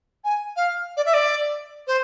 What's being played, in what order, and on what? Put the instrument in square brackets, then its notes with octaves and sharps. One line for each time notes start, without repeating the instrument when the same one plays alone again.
[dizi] G#5
F5
D5
E5
D5
C5